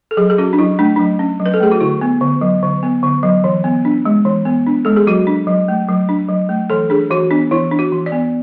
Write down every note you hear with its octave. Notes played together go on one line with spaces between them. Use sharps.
A4
F#3 G#4
G#4
C#4 F#4
D4
F#3 E4
A3 D4
F#3 D4
C#4
F#3
B4
A4
A3 G#4
F#4
D3 E4
B3
D3
F#3
D3
B3
D3
F#3
E3
B3
D4
G#3
E3
B3
D4
G#3 A4
G#4
F#3 F#4
D4
F#3
A3
F#3
D4
F#3
A3
E3 A4
D4 G#4
E3 F#4
B3 D4
E3 E4
D4
F#4
E3
D5
B3